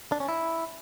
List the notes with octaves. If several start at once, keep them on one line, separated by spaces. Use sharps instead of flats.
D4
C#4
E4